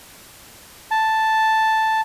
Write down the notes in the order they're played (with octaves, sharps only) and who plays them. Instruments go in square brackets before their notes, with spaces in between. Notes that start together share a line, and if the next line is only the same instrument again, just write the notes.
[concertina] A5